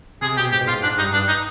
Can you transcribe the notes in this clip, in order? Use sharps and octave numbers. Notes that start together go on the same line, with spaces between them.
C3 G#4
B2 G4
G#2 G4
B2
G#2 F4
G#2 D4
G2 D#4
G2 D4
D#4